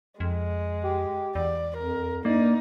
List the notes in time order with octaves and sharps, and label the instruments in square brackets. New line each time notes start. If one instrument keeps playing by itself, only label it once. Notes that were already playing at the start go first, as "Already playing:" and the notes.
[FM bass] F2 [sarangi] G#3
[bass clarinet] G4
[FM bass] E2 [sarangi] D5
[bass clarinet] F2 [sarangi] A#4
[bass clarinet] G2 [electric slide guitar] A#3 D5 [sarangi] D#4